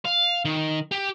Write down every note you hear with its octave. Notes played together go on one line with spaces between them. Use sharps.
F5
D#3
G4